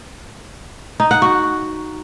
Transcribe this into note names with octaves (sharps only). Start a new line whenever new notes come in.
D#4
F#5
F#4